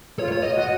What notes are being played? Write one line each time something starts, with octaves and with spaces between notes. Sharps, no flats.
F4 C#5
C#5
D#5
F#4
D#5